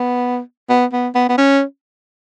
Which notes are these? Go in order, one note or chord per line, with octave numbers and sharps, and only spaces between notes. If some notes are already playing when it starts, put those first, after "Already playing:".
Already playing: B3
B3
B3
B3
B3
C#4